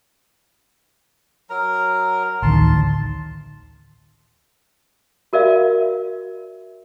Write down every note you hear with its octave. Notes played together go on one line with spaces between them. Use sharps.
F#3 A#4 A#5
A1 D2 D#3 A5 C6
F#4 A#4 D5 E5 F5